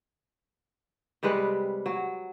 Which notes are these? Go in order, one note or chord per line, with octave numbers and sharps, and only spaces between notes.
C3 G3 G#3 B4
F#3